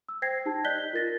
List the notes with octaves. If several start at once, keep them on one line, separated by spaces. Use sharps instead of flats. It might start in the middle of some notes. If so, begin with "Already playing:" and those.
E6
C5 G5 G#6 A#6 C7
D#4 G4 A5
D5 D#5 F#6 G6 B6 G7
F4 A#4 A6 A#6